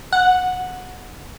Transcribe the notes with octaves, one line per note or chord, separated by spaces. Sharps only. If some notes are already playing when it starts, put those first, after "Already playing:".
F#5